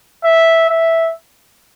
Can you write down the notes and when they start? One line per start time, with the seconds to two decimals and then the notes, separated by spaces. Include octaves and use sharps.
0.24 E5
0.70 E5